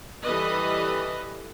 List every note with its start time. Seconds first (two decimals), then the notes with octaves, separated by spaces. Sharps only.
0.25 E3 G3 A4 B4 D#5 B5